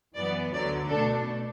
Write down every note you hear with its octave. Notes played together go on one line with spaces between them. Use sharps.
F#2 E3 B3 D5
D2 D3 F#3 D5
B2 A3 D4 A4